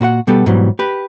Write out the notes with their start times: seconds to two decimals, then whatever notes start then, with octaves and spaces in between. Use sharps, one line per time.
0.01 A#2 F#4 B4 F#5
0.27 B2 G3 B3 G4 A4
0.46 G#2 B2 E3 F#3 G3
0.79 G4 B4